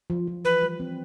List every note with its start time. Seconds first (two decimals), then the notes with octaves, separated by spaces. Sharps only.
0.10 F3
0.27 F3
0.45 E3 B4
0.62 G3
0.80 C4